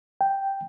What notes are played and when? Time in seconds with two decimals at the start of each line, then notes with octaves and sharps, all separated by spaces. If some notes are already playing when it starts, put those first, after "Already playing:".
0.21 G5